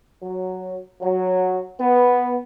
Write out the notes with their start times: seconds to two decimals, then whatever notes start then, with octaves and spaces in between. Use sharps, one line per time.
0.23 F#3
1.02 F#3
1.80 B3